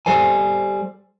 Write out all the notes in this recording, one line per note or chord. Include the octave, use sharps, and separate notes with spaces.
G3 A4 C5 G#5